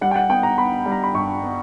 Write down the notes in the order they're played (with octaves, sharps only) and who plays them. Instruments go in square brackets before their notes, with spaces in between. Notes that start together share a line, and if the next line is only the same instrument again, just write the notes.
[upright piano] G3 F#5
G5
F#5
B3 G5
A#5
B3 B5
G3
A#5
B5
G2 C#6
B3